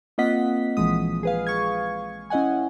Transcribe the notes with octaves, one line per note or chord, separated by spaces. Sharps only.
A#3 C4 F4 D#5 F#5 B6
A#1 E3 F3 G#3 D#6
G#4 B4 F5
C#6 G#6
C#4 E4 D#5 F#5 G#5